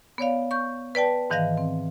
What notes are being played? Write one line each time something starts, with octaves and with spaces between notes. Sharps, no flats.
B3 C#5 D5 F5
C#6 G6
B4 D5 G5 A5
G#2 D#3 E3 D#5 F5 A#6
C4